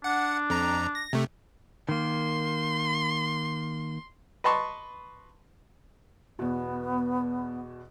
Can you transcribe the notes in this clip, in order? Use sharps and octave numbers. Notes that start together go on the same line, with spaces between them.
D4 F#5
F2 A#5
A#6
C3 A3
D#3 A#3 C6
B4 D#5 A5 C6 C#6
E2 B2 B3